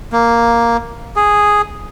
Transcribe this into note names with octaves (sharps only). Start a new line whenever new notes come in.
A#3
G#4